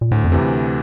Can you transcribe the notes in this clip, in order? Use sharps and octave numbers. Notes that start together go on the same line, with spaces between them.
A#2
D2 A2
F2
C3 E3